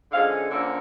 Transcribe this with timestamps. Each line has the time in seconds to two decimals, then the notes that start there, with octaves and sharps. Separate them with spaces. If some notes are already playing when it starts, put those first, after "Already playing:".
0.11 D3 F3 G#3 C#4 F5
0.50 D3 F3 A#3 C#4 E5